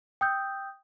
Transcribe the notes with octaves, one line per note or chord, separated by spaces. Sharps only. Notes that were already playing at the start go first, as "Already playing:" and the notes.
G5 D#6 E6 G6